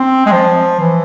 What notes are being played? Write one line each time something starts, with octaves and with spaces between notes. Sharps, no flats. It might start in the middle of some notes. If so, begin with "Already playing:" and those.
Already playing: C4
G#3
F3
E3